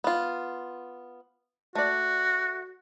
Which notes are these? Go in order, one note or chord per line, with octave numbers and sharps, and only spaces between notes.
B3 F4
A3 F#4 D5